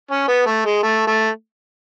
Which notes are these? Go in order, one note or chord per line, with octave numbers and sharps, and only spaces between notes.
C#4
B3
A3
G#3
A3
A3